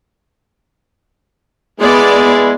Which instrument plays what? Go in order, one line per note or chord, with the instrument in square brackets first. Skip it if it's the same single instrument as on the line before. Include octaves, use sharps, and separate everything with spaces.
[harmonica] G#3 E4 G#4 [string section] B3 D5